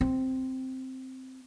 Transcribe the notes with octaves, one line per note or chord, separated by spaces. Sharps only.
C4